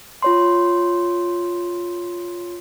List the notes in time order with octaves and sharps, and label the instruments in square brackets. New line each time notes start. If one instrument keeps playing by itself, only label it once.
[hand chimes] F4 C#5 C6